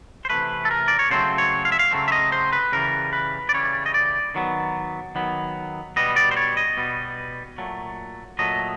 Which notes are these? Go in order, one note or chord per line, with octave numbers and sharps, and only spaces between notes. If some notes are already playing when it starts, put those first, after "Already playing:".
C5
C3 E3 A3 B4
A4
A#4
D5
C#5
C#3 F#3 A3 C4 C5
C#5
F5
E5
F5
C#3 F#3 A3 C4
E5
D#5
C5
B4
C#3 E3 G3 A#4
B4
D5
C#3 E3 G3 C#5
D#5
D5
D#3 F#3 B3
D#3 F#3 B3
B2 G3 B3 D#5
D5
C5
C#5
D#5
B2 G3 B3
A#2 F#3 A3
A#2 F#3 A3 D#5